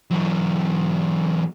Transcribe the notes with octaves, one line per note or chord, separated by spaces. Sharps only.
E2 F#3